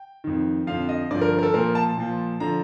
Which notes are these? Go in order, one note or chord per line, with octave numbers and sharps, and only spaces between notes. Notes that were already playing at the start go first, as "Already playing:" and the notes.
Already playing: G5
F2 D#3
F2 D3 F3 F5
D#5
G2 D3 F3 D5
A#4
A#4
A4
A#2 F3 A#4
A5
A#2 F3
D3 F3 A#5